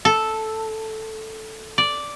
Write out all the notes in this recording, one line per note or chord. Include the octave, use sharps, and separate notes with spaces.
A4
D5